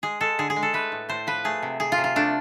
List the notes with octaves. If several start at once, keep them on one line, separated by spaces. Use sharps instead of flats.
G#3 G#4
G#3 A4
D3 G#4
G#4
G#3
A4
A3 B4
A2
A2 C5
F3 B4
A3 G#4
C3
C3 G#4
F4
C3
F4
A3 D4